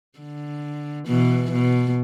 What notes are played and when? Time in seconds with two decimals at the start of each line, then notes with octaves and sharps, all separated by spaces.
0.19 D3
1.08 B2 E3
1.52 B2